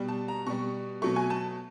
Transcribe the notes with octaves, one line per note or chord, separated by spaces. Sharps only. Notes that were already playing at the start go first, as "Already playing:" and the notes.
Already playing: B2 G3
A5
A#5
B2 G3 C#6
B2 F#3 A3 C#6
G#5
A5